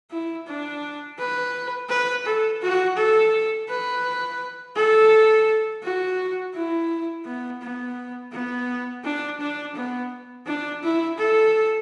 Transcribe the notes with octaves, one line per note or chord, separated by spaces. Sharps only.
E4
D4
B4
B4
A4
F#4
A4
B4
A4
F#4
E4
B3
B3
B3
D4
D4
B3
D4
E4
A4